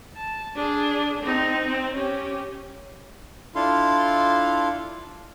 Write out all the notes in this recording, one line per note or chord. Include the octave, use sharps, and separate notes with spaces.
A5
D4 G#4
C4 D#4
C4
C#4 G4
D4 E4 F4 A4 F5 C6